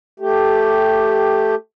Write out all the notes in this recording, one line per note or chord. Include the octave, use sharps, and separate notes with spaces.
A3 G4